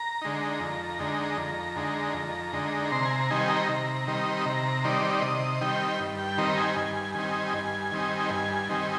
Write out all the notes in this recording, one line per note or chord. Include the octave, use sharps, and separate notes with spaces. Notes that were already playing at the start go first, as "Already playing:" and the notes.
Already playing: A#5
D3 G#3 D#4
F2
D3 G#3 D#4
F2
D3 G#3 D#4
F2
D3 G#3 D#4
C3 C6
G#5
A#5
D#3 G3 C4 D#4 G#5
A#5
C3
D#3 G3 C4 D#4
C3 A#5
D#3 G3 C4 D#4 D5
C3 D#5
D#3 G3 C4 D#4 G5
G2
G5
D#3 G3 C4 D#4 A#5
G#5
G2
D#3 G3 C4 D#4
G2
D#3 G3 C4 D#4
G2 G#5
D#3 G3 C4 D#4